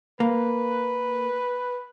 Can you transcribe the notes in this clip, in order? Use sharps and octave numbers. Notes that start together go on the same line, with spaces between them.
A#3 B4